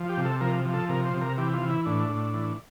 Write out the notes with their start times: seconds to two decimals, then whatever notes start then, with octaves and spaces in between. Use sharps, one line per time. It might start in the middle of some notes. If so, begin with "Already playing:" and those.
Already playing: F3
0.09 G4
0.17 C3
0.25 A4
0.41 F3 A#4
0.65 F3
0.74 A4
0.89 C3 A#4
1.06 C5
1.13 C3
1.21 A#4
1.38 E3 G4
1.53 F4
1.62 E3
1.69 E4
1.85 A2 D4
2.09 A2
2.34 E3